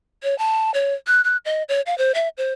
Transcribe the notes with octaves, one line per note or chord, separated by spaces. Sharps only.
C#5
A5
C#5
F#6
F#6
D#5
C#5
F5
C5
E5
C5